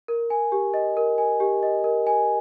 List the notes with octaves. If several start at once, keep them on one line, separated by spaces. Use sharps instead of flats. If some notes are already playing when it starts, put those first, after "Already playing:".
A#4
G#5
G4
D#5
A#4
G#5
G4
D#5
A#4
G#5